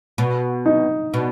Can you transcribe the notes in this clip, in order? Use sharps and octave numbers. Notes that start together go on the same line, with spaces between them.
B2
D#4
B2